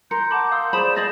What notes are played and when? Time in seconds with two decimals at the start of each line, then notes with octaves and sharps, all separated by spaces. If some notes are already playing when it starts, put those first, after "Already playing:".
0.11 A#4 C6 G6 C#7
0.31 F#5 A5 B5 D6
0.52 F5 C6 D#6 E6
0.73 G#4 C5 D5 B5 D#6 E7
0.96 G#4 C5 D#5 A6 A#6 F#7